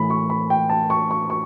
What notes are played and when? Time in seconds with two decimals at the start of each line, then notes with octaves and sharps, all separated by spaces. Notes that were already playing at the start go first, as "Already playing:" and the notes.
Already playing: A2 E3 B5
0.10 C#6
0.30 B5
0.50 G5
0.69 A5
0.90 C#6
1.11 C#6
1.30 C#6